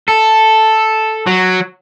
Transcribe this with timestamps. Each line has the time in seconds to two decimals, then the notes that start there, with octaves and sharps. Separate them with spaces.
0.08 A4
1.27 F#3